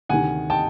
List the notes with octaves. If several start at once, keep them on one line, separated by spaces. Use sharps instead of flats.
D2 C3 D#3 F#5 G#5
G5 A5